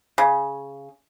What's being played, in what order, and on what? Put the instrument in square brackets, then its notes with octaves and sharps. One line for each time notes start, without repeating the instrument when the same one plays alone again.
[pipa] C#3